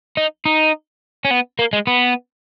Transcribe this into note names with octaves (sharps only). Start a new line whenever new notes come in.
D#4
D#4
C#4
B3
A#3
G#3
B3